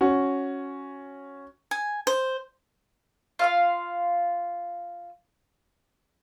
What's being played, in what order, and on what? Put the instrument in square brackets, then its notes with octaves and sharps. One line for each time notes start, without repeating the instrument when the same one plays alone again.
[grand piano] C#4 F#4
[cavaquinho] G#5
C5
[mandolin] F4 F5 C6